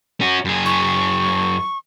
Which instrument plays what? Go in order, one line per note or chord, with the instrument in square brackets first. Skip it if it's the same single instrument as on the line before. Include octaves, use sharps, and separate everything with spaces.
[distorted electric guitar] C#4 F#4
F#2 G#4
[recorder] C#6